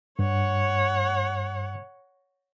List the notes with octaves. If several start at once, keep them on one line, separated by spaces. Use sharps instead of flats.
G2 C#5 F#5